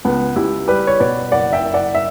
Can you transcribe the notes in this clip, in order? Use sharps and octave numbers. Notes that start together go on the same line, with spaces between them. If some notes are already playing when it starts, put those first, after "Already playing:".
C#2 B3
C#2 E4 G4
G3 G4 B4
C#5
B2 B4 D5
F#1 D5 F#5
E5 G5
F#1
D5 F#5
E5